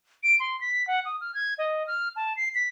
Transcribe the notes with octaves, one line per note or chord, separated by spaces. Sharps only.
D7
C6
B6
F#5
D#6
F6
G#6
D#5
F6
A5
C7
B6